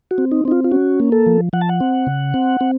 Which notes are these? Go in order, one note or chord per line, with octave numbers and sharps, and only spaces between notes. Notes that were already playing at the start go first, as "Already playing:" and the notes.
F#4
C4
D#4
C4 D#4
F4
F4
C#4 F#4
A#3
A4
F3
F3 F#5
A5
F#5
C4
C#3
C4
C4